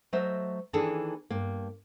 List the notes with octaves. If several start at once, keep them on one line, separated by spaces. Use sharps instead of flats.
F#3 A3 C5 D#5 E5
D#3 E3 A#3 D4 G#4 A4
G2 A#3